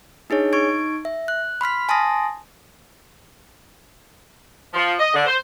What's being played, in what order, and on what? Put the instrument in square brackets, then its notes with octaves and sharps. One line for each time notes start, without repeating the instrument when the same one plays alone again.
[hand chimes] D4 D#4 G#4 C#5
D#4 C#6 G#6 D7
E5
F#6
B5 C6 F6 B6
G#5 A5 C6 D#6 A#6
[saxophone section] F3
D#5
D3
C5